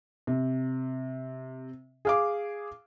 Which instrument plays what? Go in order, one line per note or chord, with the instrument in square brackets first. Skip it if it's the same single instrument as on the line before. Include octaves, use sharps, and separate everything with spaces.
[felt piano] C3
G#4 F5 D6